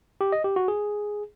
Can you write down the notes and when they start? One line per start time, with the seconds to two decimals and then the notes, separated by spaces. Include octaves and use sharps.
0.21 G4
0.32 D#5
0.44 G4
0.56 F#4
0.68 G#4